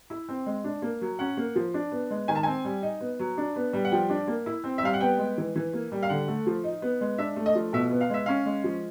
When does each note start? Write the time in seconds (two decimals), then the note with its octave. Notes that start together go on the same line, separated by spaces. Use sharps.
0.10 E4
0.29 C4
0.46 G#3
0.64 D4
0.82 A#3
1.01 F#3
1.19 C#4 F#5
1.37 A#3
1.56 F3
1.74 D4
1.92 B3
2.10 G#3
2.28 D#3 G#5
2.35 A5
2.43 C4 G#5
2.65 G3
2.82 D#4
3.00 B3
3.19 F#3
3.38 D4
3.56 B3
3.73 G3
3.85 F#5
3.91 F3 G5
4.10 D4
4.27 A#3
4.46 E4
4.64 C4
4.78 E5
4.83 G3 F5
4.94 F#5
5.01 B3 G5
5.18 G#3
5.38 E3
5.56 E3
5.73 A#3
5.92 G3
6.03 F5
6.09 D3 F#5
6.28 A3
6.47 F3
6.64 D#4
6.82 B3
7.01 G#3
7.18 D4 E5
7.36 A3
7.46 D#5
7.55 F3
7.73 B2 E5
7.91 B3
8.01 F5
8.10 G#3 E5
8.26 C#4 F5
8.46 G#3
8.64 F3